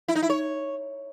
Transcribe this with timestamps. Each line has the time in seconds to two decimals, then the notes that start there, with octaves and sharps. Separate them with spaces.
0.08 E4
0.15 D#4
0.22 E4
0.30 C#5